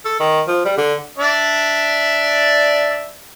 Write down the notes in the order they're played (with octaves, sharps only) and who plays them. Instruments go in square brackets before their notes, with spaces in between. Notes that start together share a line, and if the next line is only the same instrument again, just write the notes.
[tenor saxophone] A4
D#3
F3
G3
D3
[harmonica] D4 D5 E5